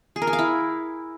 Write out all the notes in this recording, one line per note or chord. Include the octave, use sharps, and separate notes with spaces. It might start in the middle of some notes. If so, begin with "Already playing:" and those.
G#4
A#4
G#4
F5
E4